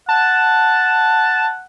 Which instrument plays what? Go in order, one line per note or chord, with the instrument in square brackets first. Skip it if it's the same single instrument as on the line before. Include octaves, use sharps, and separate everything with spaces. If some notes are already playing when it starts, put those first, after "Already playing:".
[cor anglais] F#5 [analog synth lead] A5